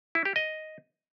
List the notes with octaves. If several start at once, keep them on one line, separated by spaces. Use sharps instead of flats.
E4
G4
D#5